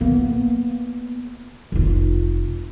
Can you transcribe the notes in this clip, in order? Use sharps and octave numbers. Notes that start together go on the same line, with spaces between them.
A#3 B3
F1 F4